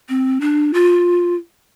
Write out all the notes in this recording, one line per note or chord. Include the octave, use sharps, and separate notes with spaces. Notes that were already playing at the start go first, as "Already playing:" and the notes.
C4
D4
F4